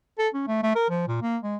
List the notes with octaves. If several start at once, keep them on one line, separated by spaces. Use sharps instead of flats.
A4
C#4
A3
A3
A#4
F3
A#2
A#3
G#3